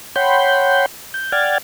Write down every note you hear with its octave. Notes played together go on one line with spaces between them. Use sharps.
C#5 F#5 G5 B5 C6 G6
G6
D5 F#5 G5 F6 G#6 A6